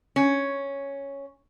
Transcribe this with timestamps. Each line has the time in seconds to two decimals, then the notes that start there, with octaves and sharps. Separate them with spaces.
0.16 C#4